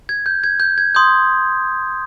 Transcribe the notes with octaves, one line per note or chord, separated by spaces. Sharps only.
G#6
G6
G#6
G6
G#6
C6 D#6 G6